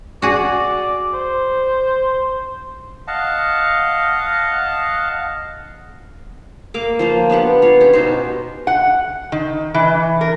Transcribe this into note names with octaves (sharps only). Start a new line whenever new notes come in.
F#4 G#4 D5
C5
D#5 F5 F#5 A5
A#3 F5 D6
F3 A#3 C5
B3 D4 G4 F#5
F4 C#5
C#4 G4
B2 D#4 C5
F#5
D#3
E3
A#4